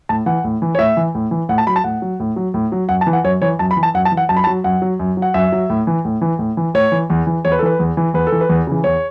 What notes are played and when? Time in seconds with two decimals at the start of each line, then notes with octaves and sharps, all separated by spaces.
0.09 A2 A5
0.26 E3 F#5
0.44 A2
0.62 E3
0.75 C#5
0.79 A2 E5
0.97 E3
1.15 A2
1.31 E3
1.49 A2 F#5
1.58 A5
1.67 F#3 B5
1.76 A5
1.84 A2 F#5
2.02 F#3
2.20 A2
2.36 F#3
2.54 A2
2.72 F#3
2.89 F#2 F#5
3.01 A5
3.07 E3
3.13 F#5
3.24 F#2 C#5
3.41 E3 C#5
3.59 F#2 A5
3.71 B5
3.77 E3
3.83 A5
3.94 F#2 F#5
4.05 A5
4.12 E3
4.17 F#5
4.29 F#2 A5
4.37 B5
4.44 A5
4.47 F#3
4.64 F#2 F#5
4.82 F#3
4.99 F#2
5.17 F#3
5.22 F#5
5.34 F#2 E5
5.52 F#3
5.70 A2
5.87 E3
6.05 A2
6.22 E3
6.39 A2
6.57 E3
6.74 A2 C#5
6.92 E3
7.10 E2
7.27 E3
7.45 E2 C#5
7.52 B4
7.59 A4
7.62 E3 B4
7.79 E2
7.97 E3
8.14 E2 B4
8.27 A4
8.32 E3
8.41 B4
8.49 E2
8.67 C#3 E3
8.84 E2 C#5